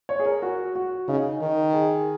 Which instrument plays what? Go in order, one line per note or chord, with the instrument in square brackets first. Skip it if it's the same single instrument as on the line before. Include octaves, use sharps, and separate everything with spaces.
[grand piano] C#5
G#4
A#4
F#4
F#4
[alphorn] C#3 [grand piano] D#4
[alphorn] D#3
[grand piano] G#4